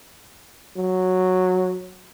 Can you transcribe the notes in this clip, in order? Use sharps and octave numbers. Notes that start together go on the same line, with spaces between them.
F#3